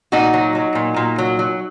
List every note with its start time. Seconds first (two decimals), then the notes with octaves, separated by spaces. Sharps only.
0.12 A#2 D#4 F#4
0.34 F#3
0.55 F#3
0.75 A#2
0.96 A#2
1.18 F#3
1.39 F#3